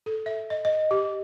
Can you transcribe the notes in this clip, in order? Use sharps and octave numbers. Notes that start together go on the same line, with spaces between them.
A4
E5
D#5
D#5
G4